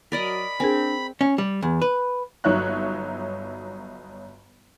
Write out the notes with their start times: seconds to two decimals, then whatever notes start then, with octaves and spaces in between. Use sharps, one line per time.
0.12 F#3 A#4 D5 D#5 B5
0.60 C4 D4 G#4 A#4 G#5
1.21 C#4
1.38 G3
1.62 E2
1.82 B4
2.44 G1 F#3 D#4 C#5 E5 F#6